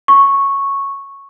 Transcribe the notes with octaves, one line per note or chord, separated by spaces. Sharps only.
C#6